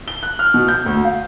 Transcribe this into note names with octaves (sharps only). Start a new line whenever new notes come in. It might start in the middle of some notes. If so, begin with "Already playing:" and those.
G7
F#6
F6
B2
G6
D2
F5